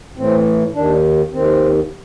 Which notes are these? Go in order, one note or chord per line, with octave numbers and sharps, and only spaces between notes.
A2 E3 C4
D#2 D#3 D4
D#2 D#3 C4